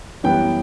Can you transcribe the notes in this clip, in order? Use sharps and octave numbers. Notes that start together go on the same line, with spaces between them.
F#2 E3 G3 B3 G5